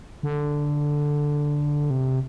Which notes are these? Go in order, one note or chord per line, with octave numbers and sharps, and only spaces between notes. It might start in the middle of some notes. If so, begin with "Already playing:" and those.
D3
C3